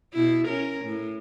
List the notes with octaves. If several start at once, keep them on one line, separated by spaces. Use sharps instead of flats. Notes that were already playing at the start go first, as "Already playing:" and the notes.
B2 E4
C#4 A#4
A2